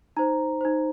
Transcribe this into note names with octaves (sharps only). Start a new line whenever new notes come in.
D#4 C5 A#5
D#4 C5